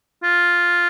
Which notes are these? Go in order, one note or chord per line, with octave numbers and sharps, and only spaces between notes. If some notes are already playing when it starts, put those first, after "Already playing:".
F4